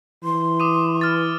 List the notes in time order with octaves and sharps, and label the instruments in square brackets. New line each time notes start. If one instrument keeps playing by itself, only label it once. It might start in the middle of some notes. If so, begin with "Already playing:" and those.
[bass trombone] E3 [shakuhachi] C6
[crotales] D6 D#6 D#7
F6 A6